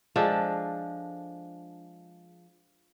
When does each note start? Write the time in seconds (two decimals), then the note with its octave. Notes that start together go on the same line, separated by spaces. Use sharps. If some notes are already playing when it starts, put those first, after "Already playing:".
0.16 F3 G#3 D4 A4